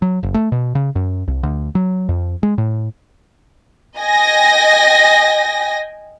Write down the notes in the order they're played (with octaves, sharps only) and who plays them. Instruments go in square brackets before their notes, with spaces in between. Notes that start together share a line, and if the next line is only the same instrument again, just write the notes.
[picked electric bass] F#3
F#1
A3
B2
C#3
F#2
C2
D2
F#3
F2
G#3
A2
[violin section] D#5 G5 G#5 A#6